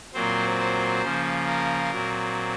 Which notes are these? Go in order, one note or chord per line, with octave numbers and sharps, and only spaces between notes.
A#2 F#3 C4 C5
C5
C#3 F3 A#3
A#4
A#2 F#3 C4